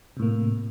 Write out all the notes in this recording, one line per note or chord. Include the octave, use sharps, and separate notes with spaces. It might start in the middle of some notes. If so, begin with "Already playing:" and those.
A2 C3 A#3